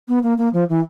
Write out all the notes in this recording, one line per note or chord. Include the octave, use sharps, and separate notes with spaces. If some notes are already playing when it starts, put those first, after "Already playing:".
B3
A#3
A#3
F3
E3